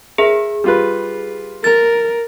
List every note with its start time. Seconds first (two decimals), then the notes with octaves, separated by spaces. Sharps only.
0.18 G#4 A#4 E5
0.64 G3 F4 B4
1.64 A#4 A6